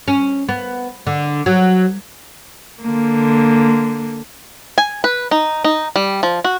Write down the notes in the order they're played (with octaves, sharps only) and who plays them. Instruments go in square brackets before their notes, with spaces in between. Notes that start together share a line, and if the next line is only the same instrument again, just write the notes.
[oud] C#4
B3
D3
F#3
[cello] D3 A#3
[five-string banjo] G#5
B4
D#4
D#4
G3
F3
F#4